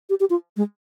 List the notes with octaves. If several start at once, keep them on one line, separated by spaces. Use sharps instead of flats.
G4
G4
F4
G#3